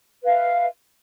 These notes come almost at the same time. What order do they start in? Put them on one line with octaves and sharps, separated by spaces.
B4 F5 E5